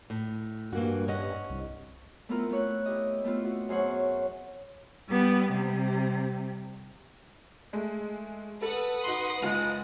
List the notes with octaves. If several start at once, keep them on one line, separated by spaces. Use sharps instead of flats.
A2
G2 E3 A#3 F#4
C#4 D#5 F#5
C2
A3 B3 C4 E4 F4 A#4
A3 C#5 F#6
E4 G4 D#5
A3 B3 C4 F4
F#4
F#2 G#4 C5 C#5 F#5
G3 B3
C3 G3
G#3 A3
A4 B4 F#5 D#6
D#4 F#4 C6 F#7
F#1 G#3 F4 F7